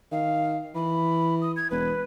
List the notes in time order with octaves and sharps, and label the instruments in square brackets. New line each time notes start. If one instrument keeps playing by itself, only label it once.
[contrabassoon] D#3 [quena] F5
[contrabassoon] E3 [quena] B5
[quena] D#6
G#6
[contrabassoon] E1 [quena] B4